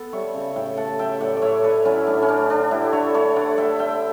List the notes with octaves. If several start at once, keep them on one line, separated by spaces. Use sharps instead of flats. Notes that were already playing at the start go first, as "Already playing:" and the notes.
Already playing: B3 A4
G3 C#5 E5
C#3
A2 E5 G5
A3 F#5 A5
F#3 E5 G5
A2 D5 F#5
D5
A2 C#5 E5
A3 B4 D5
F#3 C#4 E4
A2 D4
C#4
A3 D4
D3 D4
A3 E4 G4
D3 C#5 E5
A3 A4 C#5
D3 D5 F#5
A3 E5 G5
D3 E5 G5